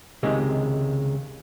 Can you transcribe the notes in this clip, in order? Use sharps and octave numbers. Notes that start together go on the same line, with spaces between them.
C#2 C3 D#3 G#3